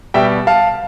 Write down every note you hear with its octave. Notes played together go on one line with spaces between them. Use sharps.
B2 G3 E5 G5
F5 A5